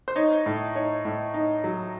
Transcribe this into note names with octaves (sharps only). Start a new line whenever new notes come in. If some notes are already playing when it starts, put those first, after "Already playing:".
C5
D#4 C#5
A2
D#4 C#5
A2
D#4
F#3